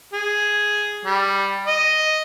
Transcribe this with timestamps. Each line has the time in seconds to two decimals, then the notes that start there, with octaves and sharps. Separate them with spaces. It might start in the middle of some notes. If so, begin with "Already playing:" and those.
0.13 G#4
1.05 G3
1.67 D#5